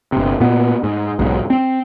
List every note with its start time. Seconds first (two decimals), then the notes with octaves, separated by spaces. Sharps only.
0.12 G1 C3
0.40 A#2 B3
0.83 G#2
1.19 B1 G#2
1.50 C4